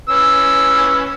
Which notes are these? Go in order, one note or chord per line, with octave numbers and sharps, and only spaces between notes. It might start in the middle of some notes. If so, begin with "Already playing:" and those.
C#4 B4 E6